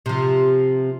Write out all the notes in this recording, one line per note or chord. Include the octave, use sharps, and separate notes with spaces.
C3 F3